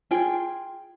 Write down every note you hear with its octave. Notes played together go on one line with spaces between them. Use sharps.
F4 G#4 G5